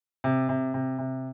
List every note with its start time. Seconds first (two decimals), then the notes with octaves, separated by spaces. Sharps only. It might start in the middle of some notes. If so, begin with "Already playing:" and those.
0.24 C3
0.49 C3
0.74 C3
0.98 C3